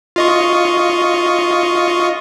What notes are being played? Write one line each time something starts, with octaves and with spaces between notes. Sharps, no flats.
F4 D#5 C#6